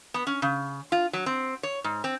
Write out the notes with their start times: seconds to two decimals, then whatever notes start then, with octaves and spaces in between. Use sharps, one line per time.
0.14 B3
0.27 C#4
0.42 C#3
0.92 F4
1.13 F#3
1.26 C4
1.63 C#5
1.84 G#2
2.04 C4